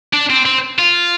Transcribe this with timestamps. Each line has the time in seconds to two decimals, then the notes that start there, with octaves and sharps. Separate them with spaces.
0.14 D4
0.30 C4
0.46 C4
0.79 F4